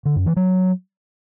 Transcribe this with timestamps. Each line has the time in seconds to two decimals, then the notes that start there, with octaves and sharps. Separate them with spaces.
0.05 D3
0.16 F#2
0.26 E3
0.37 F#3